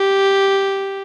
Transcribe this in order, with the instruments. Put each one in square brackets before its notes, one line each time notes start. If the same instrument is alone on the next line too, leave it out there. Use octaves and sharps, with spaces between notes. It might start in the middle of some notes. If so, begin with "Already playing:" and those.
Already playing: [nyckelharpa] G4